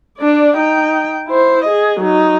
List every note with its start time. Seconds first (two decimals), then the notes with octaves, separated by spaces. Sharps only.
0.18 D4 D5
0.57 D#4 G5
1.28 E4 C5
1.64 G#4 D#5
1.99 F#3 D#4